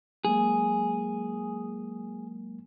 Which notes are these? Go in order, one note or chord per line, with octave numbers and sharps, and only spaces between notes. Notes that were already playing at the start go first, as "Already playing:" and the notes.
F#3 G#3 A#3 G#4